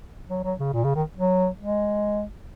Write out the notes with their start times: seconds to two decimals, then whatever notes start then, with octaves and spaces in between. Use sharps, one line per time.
0.30 F#3
0.44 F#3
0.59 C#3
0.73 A#2
0.84 C#3
0.95 D#3
1.17 F#3
1.61 G#3